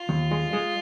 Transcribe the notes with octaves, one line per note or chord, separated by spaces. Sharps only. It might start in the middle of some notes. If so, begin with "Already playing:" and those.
Already playing: F4
D#2
G#3
G#3